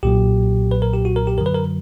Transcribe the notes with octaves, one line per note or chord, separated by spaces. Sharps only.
B1 A#2 F#3 G4
B4
A#4
G4
F#4
A#4
G4
F#2 D3 F#3 A#4
B4
A#4